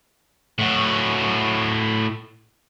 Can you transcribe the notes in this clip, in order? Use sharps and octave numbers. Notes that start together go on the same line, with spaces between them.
A2 F#4